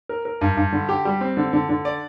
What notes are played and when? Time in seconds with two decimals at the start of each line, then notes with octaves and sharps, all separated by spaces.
0.09 A#4
0.25 A#4
0.41 G2
0.57 G2
0.72 D3
0.89 G4
1.05 G3
1.21 C4
1.37 D3
1.53 D3
1.69 D3
1.85 D5